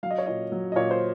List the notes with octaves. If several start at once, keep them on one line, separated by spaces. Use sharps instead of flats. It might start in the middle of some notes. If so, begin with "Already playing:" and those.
F#3 F5
D#5
C#5
A#2 D#5
F#3
D#5
A#2 C#5
C5